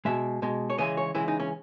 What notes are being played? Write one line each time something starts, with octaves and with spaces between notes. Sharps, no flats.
B2 G#3 E5
B2 G#3
C#5
C#3 E3 G#3 D#5
C#5
C#3 E3 G#3 E4
D#4
C#4